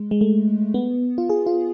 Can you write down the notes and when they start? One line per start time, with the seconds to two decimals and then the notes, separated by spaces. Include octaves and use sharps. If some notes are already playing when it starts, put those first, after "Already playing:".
Already playing: G#3
0.11 G#3
0.21 A3
0.74 B3
1.18 F4
1.29 G#4
1.46 F4